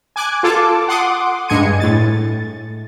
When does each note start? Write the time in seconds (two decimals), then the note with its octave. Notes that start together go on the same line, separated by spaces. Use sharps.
0.16 G#5 D6 F#6 G#6
0.43 F4 A4 A5 D6
0.88 F#5 C6 D6 D#6
1.49 G2 G#3 G#5 G#6 C#7 D#7
1.80 A2 A6